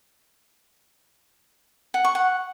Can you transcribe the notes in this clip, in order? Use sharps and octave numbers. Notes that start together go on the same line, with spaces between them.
F#5
C#6
F#5